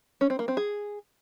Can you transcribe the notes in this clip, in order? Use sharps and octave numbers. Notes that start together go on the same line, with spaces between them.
C#4
C4
A#3
C4
G#4